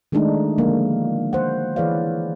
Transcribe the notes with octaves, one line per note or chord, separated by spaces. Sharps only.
D#3 G#3 A3 D4 D#4
D3 F3 G#3 A#3
C5 F#5
E3 G#4 B4 C#5 D5 F5